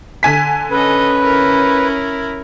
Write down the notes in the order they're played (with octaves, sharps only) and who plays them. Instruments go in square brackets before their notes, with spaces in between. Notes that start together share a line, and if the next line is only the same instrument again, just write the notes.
[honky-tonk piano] D3 G#5 B6
[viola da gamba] C#4 [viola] A4 D#5 [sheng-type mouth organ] B4
[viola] E4 A#4